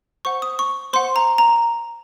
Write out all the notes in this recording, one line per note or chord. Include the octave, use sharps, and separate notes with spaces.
C5 F#5 C#6
D#6
C#6
C5 F#5 C6
A#5
A#5